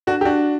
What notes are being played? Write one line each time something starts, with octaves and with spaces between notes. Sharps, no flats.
D4 F#4
G4
D4 F#4